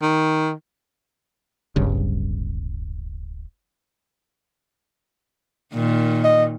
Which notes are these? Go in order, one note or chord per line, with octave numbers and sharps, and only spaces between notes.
D#3
D1 G1 G2 C#3
A#2 D#3
D#5